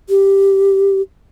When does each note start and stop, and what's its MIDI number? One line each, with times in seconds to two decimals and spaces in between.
0.09 1.01 67